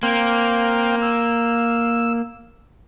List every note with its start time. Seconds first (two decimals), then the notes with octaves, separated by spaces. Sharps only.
0.03 A#3 C4 F5 G5
1.02 E6